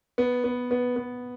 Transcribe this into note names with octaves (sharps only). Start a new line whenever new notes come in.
B3
B3
B3
B3